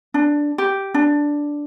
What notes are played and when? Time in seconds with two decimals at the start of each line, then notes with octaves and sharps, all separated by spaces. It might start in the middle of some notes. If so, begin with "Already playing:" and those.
0.14 D4
0.58 G4
0.94 D4